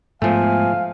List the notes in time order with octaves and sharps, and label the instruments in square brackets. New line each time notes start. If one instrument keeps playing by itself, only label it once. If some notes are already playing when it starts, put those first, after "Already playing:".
[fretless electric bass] G#2 G#3 B3 [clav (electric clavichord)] F3 A3 [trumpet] F5 [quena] G#5